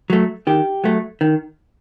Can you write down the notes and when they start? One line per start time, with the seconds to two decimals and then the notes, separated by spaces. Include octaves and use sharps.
0.10 F#3 A3
0.47 D#3 G4
0.84 F#3 A3
1.21 D#3